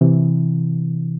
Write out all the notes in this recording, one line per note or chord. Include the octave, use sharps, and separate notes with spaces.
C3 E3